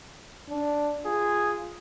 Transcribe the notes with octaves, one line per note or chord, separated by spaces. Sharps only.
D4
F4 G#4